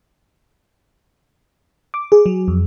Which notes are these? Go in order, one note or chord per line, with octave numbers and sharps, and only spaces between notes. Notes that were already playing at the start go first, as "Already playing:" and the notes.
D6
G#4
F#3
F2